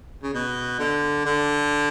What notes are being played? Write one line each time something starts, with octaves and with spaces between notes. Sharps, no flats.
C#3
B2
D3
D3